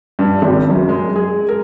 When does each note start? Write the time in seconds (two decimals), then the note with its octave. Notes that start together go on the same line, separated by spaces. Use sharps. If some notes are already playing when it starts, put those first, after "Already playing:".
0.19 G2
0.42 G#1
0.70 F#2
0.89 G#3
1.16 G#4
1.49 A#4